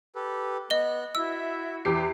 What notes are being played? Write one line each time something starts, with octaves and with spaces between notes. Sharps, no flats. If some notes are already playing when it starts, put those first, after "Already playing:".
G4 A4 B4
B3 D#5 F#6 G7
E4 F#4 E5 E6
E2 E4 G4 C7